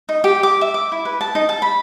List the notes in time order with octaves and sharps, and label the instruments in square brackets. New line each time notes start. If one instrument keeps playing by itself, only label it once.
[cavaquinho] D#4
G4
D6
E5
D6
E4
B4
A5
D#4
A5
B5